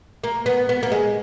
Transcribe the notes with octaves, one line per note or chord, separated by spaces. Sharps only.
A#3
B3
B3
A#3
G#3